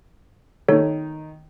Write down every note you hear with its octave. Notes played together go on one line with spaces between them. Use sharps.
D#3 D#4 A4 C#5